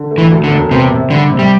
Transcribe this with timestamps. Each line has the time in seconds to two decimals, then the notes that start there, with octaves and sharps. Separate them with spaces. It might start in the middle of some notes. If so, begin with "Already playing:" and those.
Already playing: D3
0.11 A3
0.18 E3
0.32 D2
0.44 D3
0.50 E1
0.71 C3 B3
0.91 C3
1.10 D3 G3
1.30 C3
1.39 G3